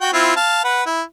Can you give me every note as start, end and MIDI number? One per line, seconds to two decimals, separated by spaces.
0.01 0.13 66
0.01 0.13 79
0.13 0.32 60
0.13 0.32 64
0.13 0.32 65
0.37 0.62 77
0.37 0.62 81
0.64 0.83 71
0.64 0.83 78
0.86 1.01 64